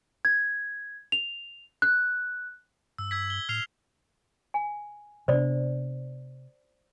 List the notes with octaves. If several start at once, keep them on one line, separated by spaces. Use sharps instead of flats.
G#6
F7
F#6
G2 E6
E6 G#6 B6
G7
A2 F6 C7 F7
G#5
C3 B3 D4 C5 D5